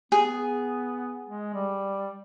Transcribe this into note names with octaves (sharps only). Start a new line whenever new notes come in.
B3 G#4
G#3
G3